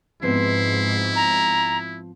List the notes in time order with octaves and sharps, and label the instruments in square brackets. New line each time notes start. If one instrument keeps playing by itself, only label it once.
[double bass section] G#2 [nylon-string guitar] F3 B3 C4 [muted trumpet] E4 [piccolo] C7
[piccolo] A#5